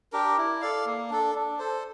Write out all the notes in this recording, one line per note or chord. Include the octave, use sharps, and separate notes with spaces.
D4 G4 A#4
E4
A4 D5 F5
A#3
D4 A4
D4
A4 C5